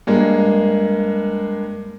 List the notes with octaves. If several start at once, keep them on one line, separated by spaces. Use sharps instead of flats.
G2 G#3 A#3